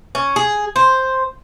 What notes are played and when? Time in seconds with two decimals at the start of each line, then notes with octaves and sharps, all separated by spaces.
0.15 C#4
0.36 G#4
0.76 C5